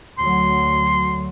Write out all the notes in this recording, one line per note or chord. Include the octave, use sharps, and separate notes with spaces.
D2 F#3 C6